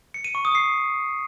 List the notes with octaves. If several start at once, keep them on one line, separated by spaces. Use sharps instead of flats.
C#7
D#7
C#6
D#6
C7